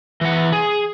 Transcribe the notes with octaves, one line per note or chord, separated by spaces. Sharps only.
E3 F#5
G#4